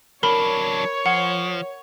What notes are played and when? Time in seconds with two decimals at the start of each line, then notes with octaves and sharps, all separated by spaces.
0.23 F#3 D4 A#4 C#5 B5
1.06 F3 F#5